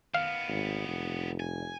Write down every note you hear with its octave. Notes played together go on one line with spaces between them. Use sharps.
D#3 B3 F5
G#1
F1
G#5